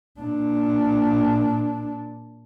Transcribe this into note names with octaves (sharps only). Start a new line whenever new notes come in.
A#2 D4